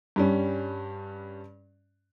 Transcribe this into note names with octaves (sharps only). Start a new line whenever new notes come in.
G2 G3 C#4